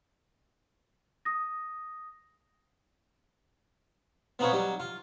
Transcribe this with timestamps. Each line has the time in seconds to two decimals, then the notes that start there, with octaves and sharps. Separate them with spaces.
1.25 D#6 A#6
4.39 B3 C4 D#4 F4 B4 C#5
4.52 F#3 G3 D#4
4.80 F4